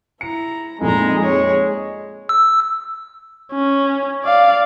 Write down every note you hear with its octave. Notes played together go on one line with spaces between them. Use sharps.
E4 A#5 C#7
F2 A#2 G#3 D#4 A#5
G#3 G#4 C#5
E6
C#4
D5 F5